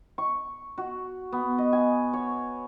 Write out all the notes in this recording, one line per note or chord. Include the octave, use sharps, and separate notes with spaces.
C#6
F#4
B3
D#5
G#5
C#5